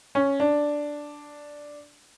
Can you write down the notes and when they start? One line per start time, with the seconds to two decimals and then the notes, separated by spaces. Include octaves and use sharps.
0.15 C#4
0.40 D4